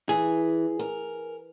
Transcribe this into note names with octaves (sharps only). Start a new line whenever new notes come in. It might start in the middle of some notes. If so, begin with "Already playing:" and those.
E3 G#4
A#4